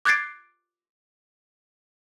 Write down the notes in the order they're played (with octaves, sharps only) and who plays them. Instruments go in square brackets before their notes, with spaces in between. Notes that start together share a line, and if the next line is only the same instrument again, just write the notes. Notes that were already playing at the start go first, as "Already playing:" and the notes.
[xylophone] D6 F#6 G#6 A6 C7 D7